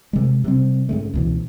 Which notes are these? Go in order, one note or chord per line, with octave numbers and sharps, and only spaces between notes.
C3 G#3
C3 G3 C4
G#2 C#3 A3
C#2 B2 E3